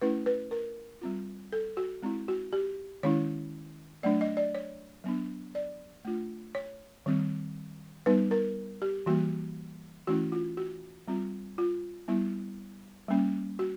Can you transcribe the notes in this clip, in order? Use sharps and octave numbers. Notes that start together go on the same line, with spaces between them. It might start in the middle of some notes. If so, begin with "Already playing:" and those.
A3 C#4 E4 B4
B4
A#4
G3 C4 F4
A4
F#4
G#3 C4 E4
F#4
G4
D#3 G#3 C#4 E4 C#5
F#3 A3 D4 D5
D#5
D5
C#5
F#3 B3 D4
D5
A3 D4 F4
C#5
D#3 G3 C4
G3 B3 D#4 B4
A#4
G4
E3 G3 A#3 F#4
E3 A3 C#4 E4 F#4
F4
F#4
G3 C4 F4
F4
G3 B3 E4
G3 A#3 C#4
F#4